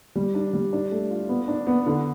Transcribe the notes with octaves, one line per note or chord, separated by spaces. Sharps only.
G3
D4
G3
D4
A3
F4
B3
D4
B3
D3